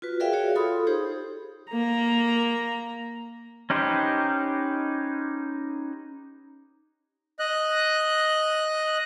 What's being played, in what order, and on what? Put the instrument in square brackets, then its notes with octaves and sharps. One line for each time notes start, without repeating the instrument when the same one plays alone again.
[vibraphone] F4 F#4 B4
G#4 A#4 D5 E5 F5 G5
F#4 G#4 C#5 D5 F5
F4 A4 B5 C6 D#6
D#4 G4 G#4 C5
[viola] A#3 A#5
[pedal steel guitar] C#4 D#4 G4 B4 C5
[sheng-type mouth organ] D#5 F#6